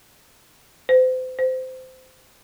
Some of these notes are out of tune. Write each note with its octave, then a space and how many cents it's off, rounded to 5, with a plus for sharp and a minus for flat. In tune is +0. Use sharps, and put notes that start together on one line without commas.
C5 -35
C5 -20